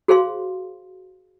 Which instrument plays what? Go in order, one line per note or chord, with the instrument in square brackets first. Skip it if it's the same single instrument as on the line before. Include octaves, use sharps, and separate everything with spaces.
[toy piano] F#4 G#4 C5 F5 C6